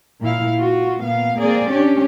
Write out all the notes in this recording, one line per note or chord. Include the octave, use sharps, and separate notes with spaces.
A#2 E4 F5
F4 F#4
A#2 B3 F5
A#3 C4 G#4 D5
C#4 D4 G4